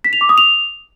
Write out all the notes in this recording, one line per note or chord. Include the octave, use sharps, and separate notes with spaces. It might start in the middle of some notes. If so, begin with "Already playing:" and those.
B6
F7
D6
D#6
F7